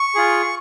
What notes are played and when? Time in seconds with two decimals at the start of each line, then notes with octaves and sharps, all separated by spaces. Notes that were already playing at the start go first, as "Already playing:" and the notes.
Already playing: C#6
0.15 F4 G#4